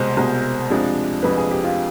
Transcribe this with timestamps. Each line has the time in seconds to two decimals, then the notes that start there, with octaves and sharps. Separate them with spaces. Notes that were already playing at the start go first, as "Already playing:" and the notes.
Already playing: C2 B2 G#3 C5
0.17 C2 B2 G#3
0.70 F2 C3 F3 G#3 D4
1.23 F2 C3 F3 G#3 B4
1.38 G#4
1.51 G4
1.64 F4